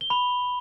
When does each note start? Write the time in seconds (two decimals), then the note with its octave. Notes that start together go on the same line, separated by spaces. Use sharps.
0.01 G7
0.10 B5 F7